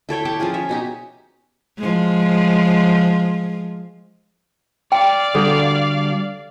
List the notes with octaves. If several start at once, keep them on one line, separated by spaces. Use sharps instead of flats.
E4 A4 C#5 G5
G4 A4 G5 A5
F3 C#4 F4 G#4
C#5 E5
B2 D#4 G4
F3 G#3
D5 F5 G5
D3 G3 F#4 A4